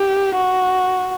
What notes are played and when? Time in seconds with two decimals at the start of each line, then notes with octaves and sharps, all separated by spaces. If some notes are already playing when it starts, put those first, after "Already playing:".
Already playing: G4
0.36 F#4